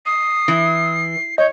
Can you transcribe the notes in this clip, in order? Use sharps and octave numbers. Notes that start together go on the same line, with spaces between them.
D#6 C7
E3
C#5 D#5 G6